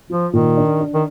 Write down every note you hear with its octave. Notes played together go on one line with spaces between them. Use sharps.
F3 F4
A#2 D#3
D4
D4
D#3